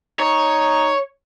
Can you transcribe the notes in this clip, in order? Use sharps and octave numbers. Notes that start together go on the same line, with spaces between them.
D#4 C#5